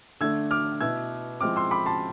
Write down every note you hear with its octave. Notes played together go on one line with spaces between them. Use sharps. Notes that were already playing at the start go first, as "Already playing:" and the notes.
D3 A3 D4 E6 G#6
D6 F6
B2 B3 E4 E6 G#6
F3 G#3 C4 E4 D6 F6
C6 E6
B5 D6
A5 C6